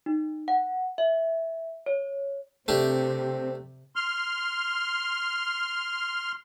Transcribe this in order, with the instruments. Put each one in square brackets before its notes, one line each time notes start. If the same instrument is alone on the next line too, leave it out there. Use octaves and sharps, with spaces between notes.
[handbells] D#4
F#5
E5
C#5
[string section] C3 [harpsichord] A3 D4 G4 [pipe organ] C4
[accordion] C6 F6